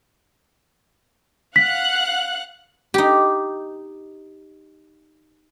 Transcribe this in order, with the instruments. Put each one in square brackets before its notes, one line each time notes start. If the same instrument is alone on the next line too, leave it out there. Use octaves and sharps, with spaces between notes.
[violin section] F5 F#5 F#6 [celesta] B6
[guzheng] D#4 G4